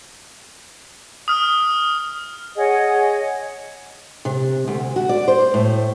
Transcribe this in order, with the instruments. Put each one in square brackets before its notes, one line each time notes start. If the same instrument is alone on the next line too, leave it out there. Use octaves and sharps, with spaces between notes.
[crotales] D#6 F6
[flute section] G#4 C#5 D#5 F#5
[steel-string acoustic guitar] C3
D2
F#4
D5
C5
A2